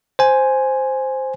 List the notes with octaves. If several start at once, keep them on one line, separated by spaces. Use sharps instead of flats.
C5 G#5